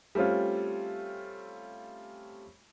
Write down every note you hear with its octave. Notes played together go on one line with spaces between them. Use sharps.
G3 A3 C4 C#4 F4